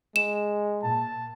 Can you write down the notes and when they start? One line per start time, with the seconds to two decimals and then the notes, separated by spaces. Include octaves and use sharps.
0.16 G#3 E7
0.83 A#2 A5